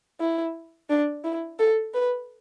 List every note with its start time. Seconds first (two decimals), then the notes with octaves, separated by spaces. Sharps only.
0.20 E4
0.89 D4
1.24 E4
1.59 A4
1.94 B4